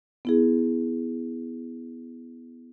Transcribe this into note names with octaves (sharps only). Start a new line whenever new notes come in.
B3 E4 G#4